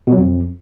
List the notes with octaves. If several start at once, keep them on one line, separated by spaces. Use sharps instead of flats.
B2
F#3
F2